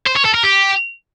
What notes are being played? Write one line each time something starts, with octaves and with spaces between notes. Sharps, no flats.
C5
C#5
A4
A#4
G4